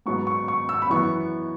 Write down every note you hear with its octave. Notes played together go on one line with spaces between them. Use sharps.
G#2 F#3 B3 C#6
C#6
C#6
E6
B5
F#2 E3 B3 C#6